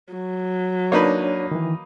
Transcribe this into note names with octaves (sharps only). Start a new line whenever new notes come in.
F#3
A#3 D4 D#4 B4 C#5
D#3 E3